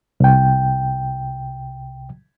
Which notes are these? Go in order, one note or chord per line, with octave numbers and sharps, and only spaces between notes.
C2 G5